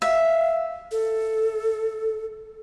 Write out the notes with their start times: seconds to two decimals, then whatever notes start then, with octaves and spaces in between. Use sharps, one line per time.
0.02 E5 F5
0.92 A4